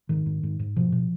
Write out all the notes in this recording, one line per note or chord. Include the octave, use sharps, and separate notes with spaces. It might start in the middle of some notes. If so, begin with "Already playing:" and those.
G#2 D#3
G#2
G#2
G#2
B2 F3
B2